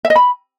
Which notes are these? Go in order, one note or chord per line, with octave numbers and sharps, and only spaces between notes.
E5
D#5
B5